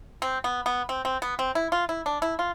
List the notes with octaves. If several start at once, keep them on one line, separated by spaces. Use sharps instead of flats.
C4
B3
B3
C4
C4
B3
C4
E4
F4
E4
D4
E4
F4